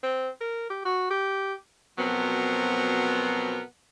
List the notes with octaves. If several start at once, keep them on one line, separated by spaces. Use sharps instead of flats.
C4
A#4
G4
F#4
G4
B2 F3 F#3 B3 C4 A#4